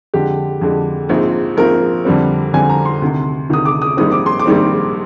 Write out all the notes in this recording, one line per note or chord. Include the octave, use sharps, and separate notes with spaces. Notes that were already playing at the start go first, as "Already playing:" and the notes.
F2 D3 G#3 G4
F2 D3 G#3
A#1 G#2 F3 C4
A#1 G#2 F3 C4 A#4
F2 D3 G3 C4
F2 D3 G3 C4 G#5
A#5
C6
D2 C3 D#3
D2 C3 D#3 D#6
D6
D#6
A#1 G#2 D#3 G3 C4 D#6
D6
C6
D6
A#1 G#2 D#3 G3 C4